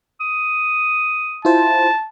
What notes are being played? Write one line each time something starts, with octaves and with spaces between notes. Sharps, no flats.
D#6
E4 F4 C5 A5